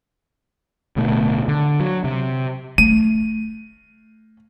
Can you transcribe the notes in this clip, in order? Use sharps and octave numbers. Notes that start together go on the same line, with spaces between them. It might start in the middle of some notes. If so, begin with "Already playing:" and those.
D1 D2 B2 A3
D3
F#3
C3
A3 D#7